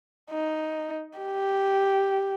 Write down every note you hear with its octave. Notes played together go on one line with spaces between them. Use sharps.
D#4
G4